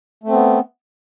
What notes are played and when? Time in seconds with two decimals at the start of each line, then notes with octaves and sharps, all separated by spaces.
0.23 A3
0.28 C4
0.32 B3